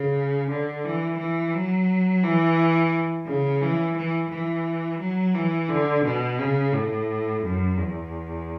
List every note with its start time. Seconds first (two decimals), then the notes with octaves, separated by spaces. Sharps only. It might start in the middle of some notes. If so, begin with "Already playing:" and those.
Already playing: C#3
0.50 D3
0.84 E3
1.18 E3
1.54 F#3
2.23 E3
3.27 C#3
3.61 E3
3.97 E3
4.31 E3
5.00 F#3
5.34 E3
5.69 D3
6.04 B2
6.39 C#3
6.73 A2
7.43 F#2
7.77 E2